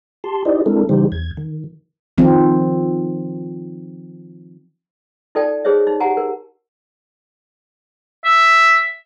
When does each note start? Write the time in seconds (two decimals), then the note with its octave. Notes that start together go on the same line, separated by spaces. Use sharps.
0.24 G4 A5 C6
0.45 D#4 E4 G4 C5 D5 D#5
0.66 G#3 C4 D4 E4 A4 A#4
0.89 C#3 E3 G3 D#4 G4 C5
1.12 E2 G#6
1.37 D#3
2.18 D#3 F3 C4
5.35 D#4 F4 A4 D5 G5 A5
5.65 D#4 G#4 C5 C#5 E5
5.87 D#4
6.00 G4 F#5 G#5 A#5
6.17 A#4
8.25 E5